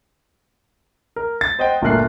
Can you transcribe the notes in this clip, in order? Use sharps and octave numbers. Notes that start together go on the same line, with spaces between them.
A#4
A6
C5 D#5 F#5 G5
G1 A#2 A3 A#4 F#6 C7